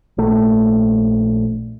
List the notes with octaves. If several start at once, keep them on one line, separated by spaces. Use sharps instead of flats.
A#1 A3